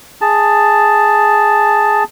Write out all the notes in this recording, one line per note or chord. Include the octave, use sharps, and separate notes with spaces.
G#4 A5